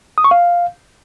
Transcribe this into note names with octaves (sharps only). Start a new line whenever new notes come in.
D#6
C#6
F5